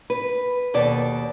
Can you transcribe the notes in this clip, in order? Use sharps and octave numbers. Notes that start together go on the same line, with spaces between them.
B4
D#2 B2 A4 D5